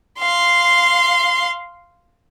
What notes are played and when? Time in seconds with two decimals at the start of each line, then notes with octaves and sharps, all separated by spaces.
0.19 F5 C6